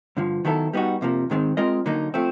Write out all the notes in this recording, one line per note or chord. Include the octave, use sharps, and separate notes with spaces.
G2 D3 F3
D#3 F#3 B3 E4 A4
G3 B3 D#4 F#4
F2 C3 F3 A#3
G#2 D#3 G#3 C4
G#3 C4 F4 A#4 D#5
D3 F#3 A#3 D#4
F3 A3 C4